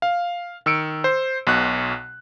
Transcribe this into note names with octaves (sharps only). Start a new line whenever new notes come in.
F5
D#3 E6 C#7 D7
C5
B1 B2 F#6